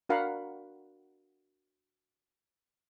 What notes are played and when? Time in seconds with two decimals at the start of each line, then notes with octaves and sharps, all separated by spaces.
0.09 D4 F#4 A#4 F5 F#5 B5